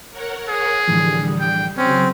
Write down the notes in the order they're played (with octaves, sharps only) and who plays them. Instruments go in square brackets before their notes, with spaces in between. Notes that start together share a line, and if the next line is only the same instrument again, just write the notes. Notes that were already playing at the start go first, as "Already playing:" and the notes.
[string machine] A#4 C#5 F#5
[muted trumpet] G#4
[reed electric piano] A2 E3 F3 [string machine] D3 G3
[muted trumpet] G5
[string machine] C#3 F#3 [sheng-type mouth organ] C4 [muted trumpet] C#4